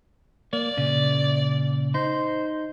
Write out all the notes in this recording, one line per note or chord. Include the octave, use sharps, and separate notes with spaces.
A#3 D5
A#2 C#3
D#4 C5